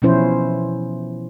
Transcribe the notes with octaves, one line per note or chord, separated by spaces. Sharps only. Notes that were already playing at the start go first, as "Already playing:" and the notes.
B2 E3 F3 C#4 E4 C5